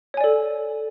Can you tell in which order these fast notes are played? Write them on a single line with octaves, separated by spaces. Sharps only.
C#5 G#5 D5 A4